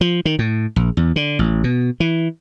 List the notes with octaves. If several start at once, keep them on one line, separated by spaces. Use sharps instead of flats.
F3
D#3
A2
A#1
E2
D3
A1
B2
E3